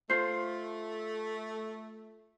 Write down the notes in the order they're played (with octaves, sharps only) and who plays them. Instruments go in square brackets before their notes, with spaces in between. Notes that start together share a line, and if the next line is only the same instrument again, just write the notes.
[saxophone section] A3 [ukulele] F4 C5